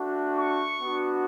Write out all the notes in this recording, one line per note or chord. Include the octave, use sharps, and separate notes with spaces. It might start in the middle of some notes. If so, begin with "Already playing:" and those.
Already playing: A3 D4 F#4
C#6
B3 D4 F#4